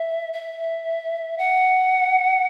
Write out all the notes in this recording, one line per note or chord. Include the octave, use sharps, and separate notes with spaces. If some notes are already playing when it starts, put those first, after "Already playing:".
Already playing: E5
E5
F#5